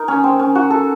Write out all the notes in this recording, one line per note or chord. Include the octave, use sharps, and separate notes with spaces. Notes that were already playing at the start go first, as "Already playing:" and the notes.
Already playing: D#4 A#4
C#4
C4
C#4
F#4
A4